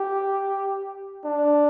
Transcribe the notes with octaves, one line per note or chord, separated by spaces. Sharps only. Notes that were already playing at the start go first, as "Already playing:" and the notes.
Already playing: G4
D4